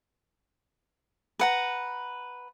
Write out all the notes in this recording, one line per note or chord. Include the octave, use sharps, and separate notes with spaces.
B4 F#5 A#5